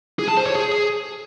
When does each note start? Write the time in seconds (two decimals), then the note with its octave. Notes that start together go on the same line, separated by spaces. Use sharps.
0.19 G#4
0.28 A5
0.37 C5
0.46 C#5
0.55 G#4